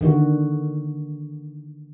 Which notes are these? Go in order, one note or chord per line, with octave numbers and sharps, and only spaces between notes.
D3 D#3 F#4